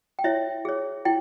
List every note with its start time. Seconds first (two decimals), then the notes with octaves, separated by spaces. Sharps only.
0.19 G5
0.24 E4 C#5 E5
0.65 G#4 C#5
1.05 E4 G5